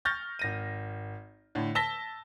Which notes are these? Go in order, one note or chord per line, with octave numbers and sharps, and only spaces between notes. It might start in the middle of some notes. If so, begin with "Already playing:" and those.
C#6 F6 G6 A6 A#6
G#1 A#6 D#7
A2 D3
A5 E6 A#6 B6 G7